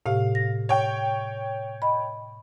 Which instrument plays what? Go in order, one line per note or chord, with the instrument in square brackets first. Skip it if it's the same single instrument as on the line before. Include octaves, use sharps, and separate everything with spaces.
[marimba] A2 C3 G4 [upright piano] F5
[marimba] A#6
[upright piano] C#5 G5
[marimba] D#5 B5